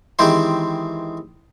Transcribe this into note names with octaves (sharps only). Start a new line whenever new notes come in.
D#3 E3 G#3 C4 G4 C5